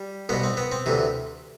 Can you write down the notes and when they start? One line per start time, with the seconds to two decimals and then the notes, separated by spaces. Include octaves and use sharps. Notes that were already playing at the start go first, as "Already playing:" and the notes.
Already playing: G3
0.29 C2 B2 B3
0.44 C4
0.57 B3
0.72 C4
0.86 D2 C3 E3